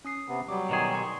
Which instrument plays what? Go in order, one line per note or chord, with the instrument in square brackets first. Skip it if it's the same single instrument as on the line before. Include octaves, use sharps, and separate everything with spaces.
[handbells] C#4 D#6 C7
[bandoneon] C3 B3
[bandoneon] F#3 G3 [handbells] D6
[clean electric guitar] B2 D#3 G#4
[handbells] C6 C#6